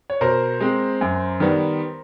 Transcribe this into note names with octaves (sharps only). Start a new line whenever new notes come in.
C#5
B2 A#4 C5
G#3 C4
F#2
D#3 G3 B3